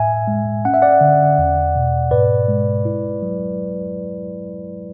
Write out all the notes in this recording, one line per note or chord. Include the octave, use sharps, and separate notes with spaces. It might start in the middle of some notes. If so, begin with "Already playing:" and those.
Already playing: A2 E5 G#5
G#3
C#4 F#5
E5
D5 F#5
D3
E2
B2
G#2 B4 D5
G#3
E4
F#3